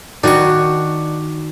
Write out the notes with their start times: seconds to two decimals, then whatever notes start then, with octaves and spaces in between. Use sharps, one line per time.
0.24 D#3 D4 F#4 C#6